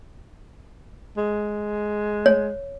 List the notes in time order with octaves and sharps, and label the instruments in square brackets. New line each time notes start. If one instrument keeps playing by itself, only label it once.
[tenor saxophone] G#3
[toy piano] C#5